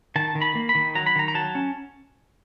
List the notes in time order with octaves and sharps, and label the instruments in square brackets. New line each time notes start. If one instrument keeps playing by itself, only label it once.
[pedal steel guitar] D#3 A5
D#3
B5
A#3
B5
D#3
F#3 A#5
B5
D#3 A#5
A#5
F#3 A5
C#4